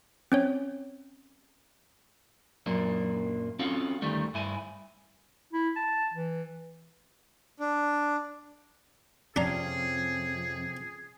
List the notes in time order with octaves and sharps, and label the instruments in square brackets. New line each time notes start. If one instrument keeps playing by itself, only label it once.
[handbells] C4 C#4 C#5
[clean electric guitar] F#2 A#2 F#3 A#3 D4
C4 C#4 F4 F#4 A4 F5
D2 D#3 G3 A3
G2 E4 G#5
[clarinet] E4
A5
E3
[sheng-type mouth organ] D4
[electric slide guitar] F2 [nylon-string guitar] C3 F3 C#4 [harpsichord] D4 A#5 [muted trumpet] G#4